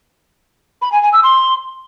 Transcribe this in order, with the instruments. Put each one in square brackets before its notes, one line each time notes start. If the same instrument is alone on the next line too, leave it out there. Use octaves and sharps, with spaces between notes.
[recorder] B5
G#5
G#5
E6
C6